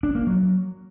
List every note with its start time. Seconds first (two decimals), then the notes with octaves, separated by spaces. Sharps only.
0.03 D4
0.15 A#3
0.27 F#3